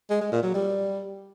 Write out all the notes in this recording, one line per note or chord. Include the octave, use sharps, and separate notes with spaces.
G#3
G#3
A#2
F#3
G3